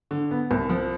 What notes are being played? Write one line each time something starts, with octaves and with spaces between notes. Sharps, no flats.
D3
B3
C2
F3